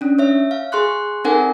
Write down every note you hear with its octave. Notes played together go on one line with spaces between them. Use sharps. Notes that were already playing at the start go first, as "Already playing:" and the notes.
C#4 D4
C#5 E5
F5
G#4 C6 C#6 F#6
C4 D#4 A4 A#4 F#5 G#5